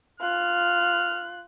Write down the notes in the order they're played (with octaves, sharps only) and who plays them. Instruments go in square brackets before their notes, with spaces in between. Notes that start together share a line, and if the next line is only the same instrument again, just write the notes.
[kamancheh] F4 F#6 [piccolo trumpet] F6